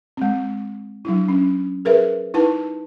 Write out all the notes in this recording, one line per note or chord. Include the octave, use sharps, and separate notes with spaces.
G#3 C4
F#3 D4 E4
C#4
G#4 A#4 B4 E5
D#4 E4 B4 A5